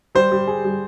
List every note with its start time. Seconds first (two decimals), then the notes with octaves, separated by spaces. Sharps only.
0.15 G3 C5
0.32 G3
0.48 G#4
0.64 G3